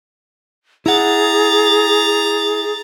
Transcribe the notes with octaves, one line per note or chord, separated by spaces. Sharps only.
E4 G#4 F#5 A#5 A6